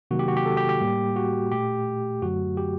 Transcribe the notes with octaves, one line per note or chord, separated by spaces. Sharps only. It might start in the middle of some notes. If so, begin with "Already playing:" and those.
C3 D#3 F#3 A#3 F#4
G4
F#4
G4
A4
G4
G4
A2 G3 A#3
F#4
A#2 A3 G4
F#2 D3 F#3 A3 F#4
G4